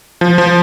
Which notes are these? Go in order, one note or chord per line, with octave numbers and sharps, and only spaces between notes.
F3
F3